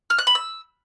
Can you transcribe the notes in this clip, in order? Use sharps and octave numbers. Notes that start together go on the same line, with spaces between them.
F6
F#6
B5
E6